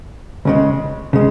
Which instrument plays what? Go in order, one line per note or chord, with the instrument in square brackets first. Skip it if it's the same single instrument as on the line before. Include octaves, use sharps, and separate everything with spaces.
[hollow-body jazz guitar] C#2 C#3 G#3
C#3 G#3